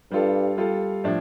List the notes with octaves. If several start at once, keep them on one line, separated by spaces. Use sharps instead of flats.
G2 G3 F4 A4
G3 F4 A4
A2 F3 D4